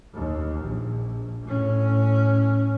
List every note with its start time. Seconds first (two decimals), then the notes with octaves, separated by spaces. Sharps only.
0.14 D#2
0.63 A#1
1.43 A2 C#4